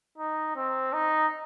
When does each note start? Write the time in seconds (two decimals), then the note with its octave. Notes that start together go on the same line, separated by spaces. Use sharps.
0.18 D#4
0.56 C4
0.93 D#4